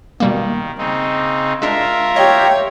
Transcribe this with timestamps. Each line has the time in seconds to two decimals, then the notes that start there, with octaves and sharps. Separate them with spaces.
0.20 B2 D#3 G3 A#3
0.78 C#3 C4 D#4
1.62 G#3 D4 F4 A#4 E5
2.16 G4 C#5 D#5